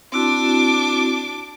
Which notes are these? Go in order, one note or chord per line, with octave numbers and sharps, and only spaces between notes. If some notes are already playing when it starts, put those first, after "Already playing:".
C4 D4 E4 F#4 D6